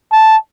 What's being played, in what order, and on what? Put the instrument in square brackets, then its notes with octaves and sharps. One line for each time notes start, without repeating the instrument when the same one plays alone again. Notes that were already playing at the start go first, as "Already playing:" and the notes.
[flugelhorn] A5